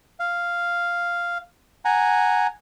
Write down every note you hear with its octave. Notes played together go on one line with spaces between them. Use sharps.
F5
F#5 G#5 A#5